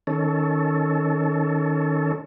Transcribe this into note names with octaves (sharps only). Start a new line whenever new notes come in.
D#3 C#4 A4